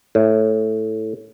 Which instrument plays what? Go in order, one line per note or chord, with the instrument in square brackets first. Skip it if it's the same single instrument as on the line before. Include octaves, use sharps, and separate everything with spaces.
[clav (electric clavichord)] A2